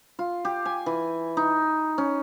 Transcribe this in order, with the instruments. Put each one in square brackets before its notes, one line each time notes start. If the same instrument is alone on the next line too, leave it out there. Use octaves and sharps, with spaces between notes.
[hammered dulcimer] F4
G4
G#5
E3
D#4
C#4